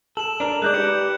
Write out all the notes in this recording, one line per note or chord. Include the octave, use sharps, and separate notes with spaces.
A4 E7 F#7
D4 A#4
G#3 D#4 D5 F#6 G6
G4 B4 D5 C#7